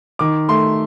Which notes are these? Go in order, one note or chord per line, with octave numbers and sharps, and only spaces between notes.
D#3 D6
A3 C6